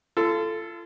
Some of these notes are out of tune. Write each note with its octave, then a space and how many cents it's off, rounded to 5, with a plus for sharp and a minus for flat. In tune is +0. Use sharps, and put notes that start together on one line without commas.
F4 -35 A4 +0